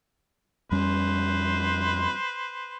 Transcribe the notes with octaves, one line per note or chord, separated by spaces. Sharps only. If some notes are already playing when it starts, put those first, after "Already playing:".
F2 G3 C#4 B4 C5